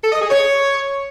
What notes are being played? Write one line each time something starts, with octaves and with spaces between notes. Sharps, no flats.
A4
D#5
G#4
C#5